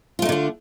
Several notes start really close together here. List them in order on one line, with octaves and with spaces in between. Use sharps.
F4 A3 D#4 D3 D4